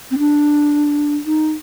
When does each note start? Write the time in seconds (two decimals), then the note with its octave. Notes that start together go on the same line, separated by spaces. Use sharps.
0.11 C4
0.19 D4
1.26 D#4